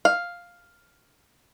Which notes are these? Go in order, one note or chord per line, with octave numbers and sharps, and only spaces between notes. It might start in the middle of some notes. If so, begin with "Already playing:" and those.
F5